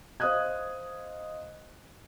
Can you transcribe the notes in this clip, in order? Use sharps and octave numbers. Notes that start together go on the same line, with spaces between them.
C5 D#5 F5 D#6 F#6 G#6